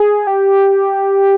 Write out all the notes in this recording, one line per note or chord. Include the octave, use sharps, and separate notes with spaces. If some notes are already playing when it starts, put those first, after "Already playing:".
Already playing: G#4
G4